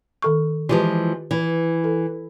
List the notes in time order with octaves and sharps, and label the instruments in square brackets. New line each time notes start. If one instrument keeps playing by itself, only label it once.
[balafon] D#3 A4 C#6
[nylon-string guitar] E3 F3 G#3 [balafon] F4 G4 B4
[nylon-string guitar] E3
[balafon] A4